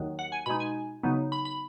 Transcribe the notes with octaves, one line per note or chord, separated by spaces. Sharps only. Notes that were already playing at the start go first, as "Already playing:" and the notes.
Already playing: D#2 D#3 F#3
F#5
G#5
B2 G#3 D#4 B5
G#5
C#3 F#3 B3 D#4
B5
B5